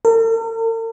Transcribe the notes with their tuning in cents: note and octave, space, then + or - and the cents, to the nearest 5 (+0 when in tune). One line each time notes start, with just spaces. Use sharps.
A#4 -45